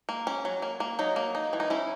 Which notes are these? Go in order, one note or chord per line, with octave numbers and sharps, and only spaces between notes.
A#3
C#4
F#3
A#3
A#3
F#3 D#4
A#3
D#4
E3
D#4
C#4 E4